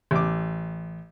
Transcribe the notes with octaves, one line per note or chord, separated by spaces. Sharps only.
A1 D6